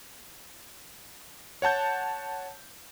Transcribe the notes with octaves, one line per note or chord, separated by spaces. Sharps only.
C#5 F#5 A5 G6